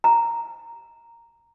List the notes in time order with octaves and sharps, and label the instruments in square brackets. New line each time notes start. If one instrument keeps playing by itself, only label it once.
[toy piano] A#5